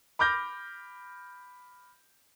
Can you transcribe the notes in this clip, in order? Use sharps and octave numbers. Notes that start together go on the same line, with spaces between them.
B5 D6 F6 G6 A#6